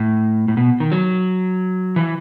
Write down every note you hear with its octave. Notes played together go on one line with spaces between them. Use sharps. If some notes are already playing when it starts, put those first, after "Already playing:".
Already playing: A2
A2
B2
D#3
F#3
E3